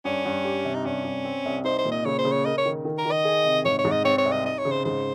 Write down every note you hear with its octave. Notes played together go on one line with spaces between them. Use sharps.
G2 C#4
G2
G4
C3
D#4
G2 C#4
G2
C4
C2
D#4 C5
C5
A#2
D#5
C#3 C#5
C5
C#3
C#5
A#4 D#5
C#5
D#3
D#3
A#4
D#3
D#5
G#4
C3
G#2 C#5
C#5
G#2
D#5
C4 C#5
C#5
C2
D#5
D#4 D#5
C#5
C#3
C5
G#2 C5